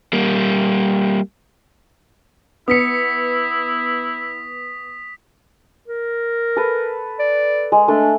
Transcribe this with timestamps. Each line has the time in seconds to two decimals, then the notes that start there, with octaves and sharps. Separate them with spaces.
0.13 G3 A#3
2.68 B3 E4 D#6 B6 C#7
5.88 A#4
6.57 A4 B4
7.19 D5
7.72 G#3
7.88 A3 D4